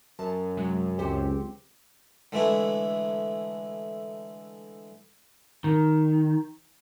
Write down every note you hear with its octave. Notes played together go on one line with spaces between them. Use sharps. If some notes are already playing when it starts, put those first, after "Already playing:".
F#2 A5
C3 F#3 G#3
C#2 C4 G4 C5 B6 C#7
D3 E3 G#3 A3 E4
D#3